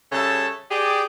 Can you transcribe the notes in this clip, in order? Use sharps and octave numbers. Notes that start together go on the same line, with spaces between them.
C#3 G3 A4 C#5 E5 A5
G4 G#4 D5